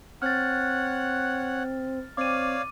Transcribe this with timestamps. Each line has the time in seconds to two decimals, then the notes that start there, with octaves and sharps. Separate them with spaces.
0.22 C4 C#5 F#5 F6 F#6 A6
2.17 C4 C#5 D5 F5 D6 D#7